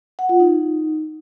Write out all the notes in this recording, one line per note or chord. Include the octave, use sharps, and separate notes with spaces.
F#5
F4
D#4